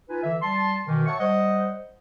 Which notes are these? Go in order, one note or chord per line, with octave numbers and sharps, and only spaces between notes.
D#4 F4 B4 G#5
D3 E3 E5
G3 A5 C6
B2 D#3 E3
C#5 E5 F#5 A5 C#6
G3 C5 D#5 F#5